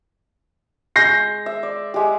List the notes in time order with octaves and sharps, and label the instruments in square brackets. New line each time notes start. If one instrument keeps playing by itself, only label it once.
[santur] G#3 [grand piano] G6 A#6 C7
[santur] E5
D5
G#3 G4